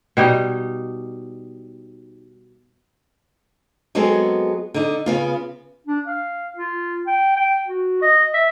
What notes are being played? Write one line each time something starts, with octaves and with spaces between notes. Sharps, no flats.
B2 G3 D#4
F#3 G#3 B3 C4 G#4 A4
D3 D#4
C#3 B3 F4
D4
F5
F4
G5
G5
F#4
D#5
E5